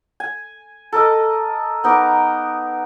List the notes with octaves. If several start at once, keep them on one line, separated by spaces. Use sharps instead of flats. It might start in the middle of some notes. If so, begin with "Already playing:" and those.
G#5
A4 A#4 D#5
B3 D#4 A#4 D6